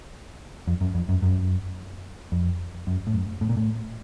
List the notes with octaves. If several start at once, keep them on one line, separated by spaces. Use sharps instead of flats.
F2
F#2
F2
F#2
F#2
F2
F#2
A2
F#2
A2
A#2
A2